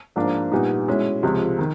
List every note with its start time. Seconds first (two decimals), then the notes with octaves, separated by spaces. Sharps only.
0.16 G#2 F3 A#3 D4
0.52 A#2 G3 B3 D#4
0.87 B2 G#3 C#4 E4
1.23 C#2 C3 F3 G#3
1.58 D#3